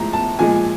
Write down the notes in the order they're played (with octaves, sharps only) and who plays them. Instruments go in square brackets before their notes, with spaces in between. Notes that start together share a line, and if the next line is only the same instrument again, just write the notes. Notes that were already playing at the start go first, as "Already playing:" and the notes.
Already playing: [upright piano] A2 F3 G#3 A#5
A5
A#2 F3 G#3 G#5